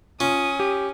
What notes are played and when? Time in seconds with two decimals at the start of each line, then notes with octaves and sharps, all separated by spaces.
0.20 C#4 F4 D#6
0.60 G4